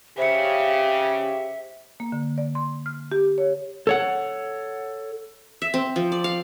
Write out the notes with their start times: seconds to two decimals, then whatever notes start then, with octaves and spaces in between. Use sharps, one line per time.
0.18 C#3 G4 C5 E5 C#7
2.00 A#3
2.12 D3
2.38 D5
2.55 C6
2.86 F6
3.12 G4
3.38 C#5
3.87 A4 C#5 F#5
5.62 E5
5.74 C4
5.96 F3
6.12 D5
6.24 F5